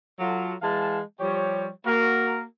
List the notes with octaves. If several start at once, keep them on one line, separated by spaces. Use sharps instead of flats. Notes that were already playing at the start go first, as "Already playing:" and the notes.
F#3 F4 A4
E3 G#3 F5 A5
F3 G3 G4 C#5
A#3 F#4 A#4